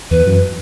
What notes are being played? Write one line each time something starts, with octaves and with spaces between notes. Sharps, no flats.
E2 B4
F#2